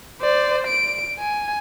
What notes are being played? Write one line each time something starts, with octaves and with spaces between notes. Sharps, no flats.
C5 D5
D7
G#5